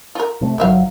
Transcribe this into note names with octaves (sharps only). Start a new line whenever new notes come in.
F4 A#4
C3 A3
G1 A#2 D#3 F#3 E5 F5